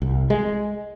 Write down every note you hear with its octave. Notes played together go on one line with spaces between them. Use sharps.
C2
G#3